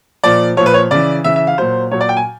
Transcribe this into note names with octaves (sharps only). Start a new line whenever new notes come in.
A#2 F3 D5
A#2 F3 C#5
B4
C#5
C#3 E3 D5
C#3 E3 E5
E5
F5
A#2 F#3 C5
A#2 F#3 C#5
D5
G5
G#5